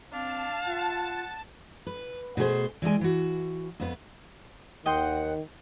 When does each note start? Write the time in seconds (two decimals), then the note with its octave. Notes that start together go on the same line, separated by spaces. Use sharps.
0.13 C4 D4 F5 A5
0.66 F4 F#5
1.86 B4
2.37 B2 A3 G#4 C5
2.82 E3 G3 G#3 G#5
3.01 E3 F#4
3.80 F2 B3 B4
4.86 D#2 D#3 D#5 F#5 G5 C6